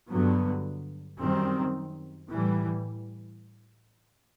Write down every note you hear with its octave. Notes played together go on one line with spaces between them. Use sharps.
G2 D3 F#3 B3
F#2 D#3 G3 C4
A2 E3 G3